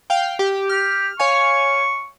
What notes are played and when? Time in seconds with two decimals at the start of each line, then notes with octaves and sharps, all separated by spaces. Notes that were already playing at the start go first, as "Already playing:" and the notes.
0.10 F5 G5
0.39 G4
0.69 G4 F6
1.20 C#5 F5 G#5 C#6